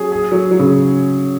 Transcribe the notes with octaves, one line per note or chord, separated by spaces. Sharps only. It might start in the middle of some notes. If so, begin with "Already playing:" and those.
Already playing: F#3 C#4 G#4
G#4
F#3
F#3
C#3